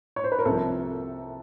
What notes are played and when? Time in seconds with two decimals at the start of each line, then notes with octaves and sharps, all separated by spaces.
0.16 C#5
0.24 C5
0.32 B4
0.39 A#4
0.45 C2 C3 F3 A4